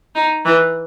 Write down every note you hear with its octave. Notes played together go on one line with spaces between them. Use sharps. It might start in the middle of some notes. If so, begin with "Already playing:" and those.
D#4
E3